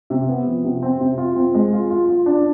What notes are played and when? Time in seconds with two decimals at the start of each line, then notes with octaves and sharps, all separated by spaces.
0.10 C3
0.28 B3
0.47 F3
0.64 C3
0.82 C4
1.01 C3
1.18 F4
1.36 C4
1.54 G#3
1.73 F4
1.90 F4
2.09 F4
2.26 D4